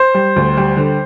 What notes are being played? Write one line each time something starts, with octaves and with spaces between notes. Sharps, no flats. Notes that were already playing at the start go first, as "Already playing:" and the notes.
Already playing: C5
G3
D2
G3
D3